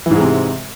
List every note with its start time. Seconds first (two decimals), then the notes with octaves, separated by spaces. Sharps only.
0.06 E3
0.11 G#2
0.15 G#3
0.20 C3